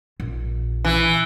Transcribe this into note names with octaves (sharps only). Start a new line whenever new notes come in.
A#1
E3